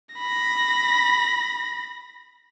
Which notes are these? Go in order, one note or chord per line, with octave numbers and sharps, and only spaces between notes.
B5 A#6